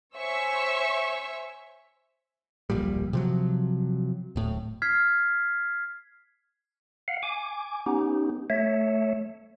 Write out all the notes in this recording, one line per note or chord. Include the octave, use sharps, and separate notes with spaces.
C5 C#5 E5 G#5 C#6 E6
D1 A#1 A#2 G3
C3 F3 F#3
D1 A2
F6 G#6 B6 C7
F5 F#5
G#5 D6
B3 C#4 D#4 G4
A3 C#5 E5